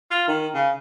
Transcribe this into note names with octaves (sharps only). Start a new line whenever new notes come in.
F4
D#3
C#3